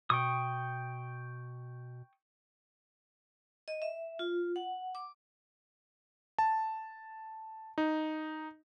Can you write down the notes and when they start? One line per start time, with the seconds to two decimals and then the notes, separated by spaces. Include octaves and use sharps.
0.10 B2 G5 C#6 D#6
3.68 D#5
3.82 E5
4.19 F4
4.56 F#5
4.95 D6
6.39 A5
7.78 D#4